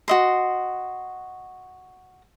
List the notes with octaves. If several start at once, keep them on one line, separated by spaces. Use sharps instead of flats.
F#4 D#5 C6